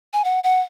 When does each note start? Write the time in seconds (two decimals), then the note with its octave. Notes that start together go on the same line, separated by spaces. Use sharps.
0.13 G#5
0.24 F#5
0.44 F#5